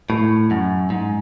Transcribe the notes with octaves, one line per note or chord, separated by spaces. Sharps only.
A2
F#2
G#2